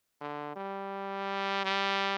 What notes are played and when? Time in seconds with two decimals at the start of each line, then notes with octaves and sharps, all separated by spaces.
0.21 D3
0.56 G3
1.65 G3